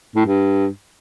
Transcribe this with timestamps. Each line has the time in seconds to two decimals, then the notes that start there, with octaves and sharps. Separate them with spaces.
0.16 A2
0.26 G2